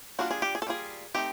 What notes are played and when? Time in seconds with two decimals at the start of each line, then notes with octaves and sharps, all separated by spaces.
0.19 G3 A#3 D4 F4 F#4
0.31 G#4
0.42 G4
0.55 G#4
0.62 A4
0.67 G3 A#3 D4 F4 G#4
1.15 A3 C4 D#4 G4